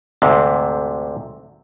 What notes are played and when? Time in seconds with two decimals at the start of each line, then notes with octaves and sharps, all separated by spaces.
0.22 D2 G#2 C3